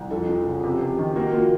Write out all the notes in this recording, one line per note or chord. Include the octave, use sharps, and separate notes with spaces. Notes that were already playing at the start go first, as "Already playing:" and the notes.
Already playing: C2
F2 A4
F3
C#3
C3
C3
D#3
A#3 F#4
A#3 F4